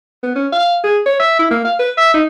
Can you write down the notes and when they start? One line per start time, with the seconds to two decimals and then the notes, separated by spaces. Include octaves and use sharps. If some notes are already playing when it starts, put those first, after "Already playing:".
0.23 B3
0.36 C#4
0.53 F5
0.84 G#4
1.06 C#5
1.19 E5
1.39 E4
1.51 A#3
1.65 F5
1.79 B4
1.98 E5
2.14 D#4